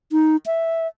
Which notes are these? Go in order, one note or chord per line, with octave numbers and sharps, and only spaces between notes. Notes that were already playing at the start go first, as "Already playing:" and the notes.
D#4
E5